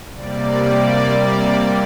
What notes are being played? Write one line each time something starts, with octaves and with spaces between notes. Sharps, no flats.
C3 G3 A#3 D5